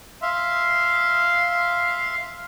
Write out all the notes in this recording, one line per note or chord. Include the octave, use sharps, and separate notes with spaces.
E5 F5 C6